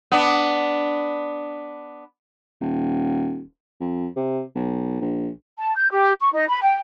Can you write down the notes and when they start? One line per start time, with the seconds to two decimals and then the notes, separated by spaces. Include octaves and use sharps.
0.12 B3 D4
2.61 D#1
3.81 F2
4.16 C3
4.55 B1
5.01 A#1
5.58 A5
5.77 G6
5.91 G4
6.21 C#6
6.33 D#4
6.49 B5
6.62 G5